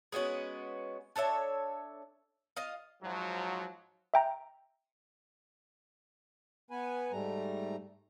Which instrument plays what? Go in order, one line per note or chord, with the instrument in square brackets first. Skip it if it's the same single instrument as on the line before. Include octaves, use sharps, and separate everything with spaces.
[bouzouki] G#3 B3 C#4 F#4
D4 A4 C#5 E5
F4 D#5 F5
[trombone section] G#2 F3 F#3
[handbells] E5 G5 A#5
[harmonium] B3 B4 G#5
G#2 G3 A3 A#5